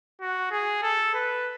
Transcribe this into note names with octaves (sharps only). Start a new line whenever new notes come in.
F#4
G#4
A4
B4